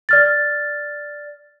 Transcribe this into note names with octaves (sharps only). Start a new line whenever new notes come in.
D5 F6 A6